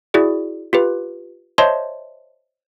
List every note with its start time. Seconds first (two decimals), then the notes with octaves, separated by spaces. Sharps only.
0.14 E4 F#4 G#4 D5
0.73 F4 G4 B4
1.58 C5 C#5 D#5 E5 A5 C6